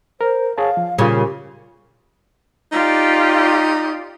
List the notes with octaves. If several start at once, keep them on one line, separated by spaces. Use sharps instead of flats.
A#4 C5
G#4 C#5 F5 A5
F3
A#2 C#3 G3 F4
G4
D#4 F4 G4 D5